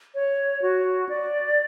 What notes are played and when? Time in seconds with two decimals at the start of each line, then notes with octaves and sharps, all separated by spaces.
0.15 C#5
0.62 F#4
1.09 D5